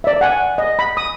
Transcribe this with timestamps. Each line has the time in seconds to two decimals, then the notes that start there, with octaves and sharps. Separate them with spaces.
0.04 D5 E5
0.21 F#5 G#5
0.58 D#5
0.79 B5
0.97 D#6